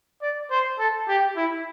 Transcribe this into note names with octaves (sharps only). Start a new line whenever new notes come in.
D5
C5
A4
G4
E4